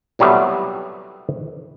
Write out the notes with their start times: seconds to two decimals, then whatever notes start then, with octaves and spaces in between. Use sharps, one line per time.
0.19 C3 F#3 G3 A3 B3 E4